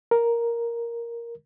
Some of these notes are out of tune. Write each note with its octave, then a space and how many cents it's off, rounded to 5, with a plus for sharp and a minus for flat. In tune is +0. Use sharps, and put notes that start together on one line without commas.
A#4 +5